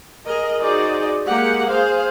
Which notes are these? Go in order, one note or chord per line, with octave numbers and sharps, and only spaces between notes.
G#4 A#4 D#5
D#4 F#4 G#4 C5 D5 D#5
G#3 A#3 G4 G#4 F#5
G#4 C5 F5